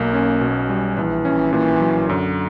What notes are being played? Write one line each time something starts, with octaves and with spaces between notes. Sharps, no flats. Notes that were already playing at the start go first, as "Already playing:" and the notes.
Already playing: B1 A#3
C#4
B2
G3
A#1 E3
C#4
A#2 E3
F#3
F#2 D3